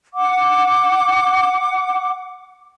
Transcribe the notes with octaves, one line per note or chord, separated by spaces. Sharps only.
F#5 D6